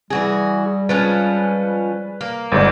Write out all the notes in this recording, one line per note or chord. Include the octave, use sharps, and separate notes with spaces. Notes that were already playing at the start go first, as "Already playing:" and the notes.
E3 G3 F#4 G#4
F3 G#3 C#4 B4
A#3
G1 G#2 D5